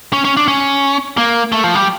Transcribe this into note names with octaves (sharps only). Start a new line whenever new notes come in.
C#4
C#4
D4
C#4
A#3
A3
F3
G3